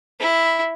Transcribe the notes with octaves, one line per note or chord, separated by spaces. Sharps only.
E4